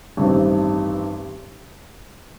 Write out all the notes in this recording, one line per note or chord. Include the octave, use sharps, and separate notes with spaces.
A1 G2 D#3 G3 C4